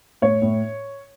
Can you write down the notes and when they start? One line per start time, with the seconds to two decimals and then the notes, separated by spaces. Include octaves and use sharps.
0.22 A2 C#5
0.42 A2